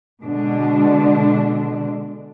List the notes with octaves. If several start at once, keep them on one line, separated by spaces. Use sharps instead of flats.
B2 D3 G#3 D4